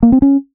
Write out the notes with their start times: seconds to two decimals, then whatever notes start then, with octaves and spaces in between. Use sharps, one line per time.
0.03 A#3
0.12 C4
0.22 C#4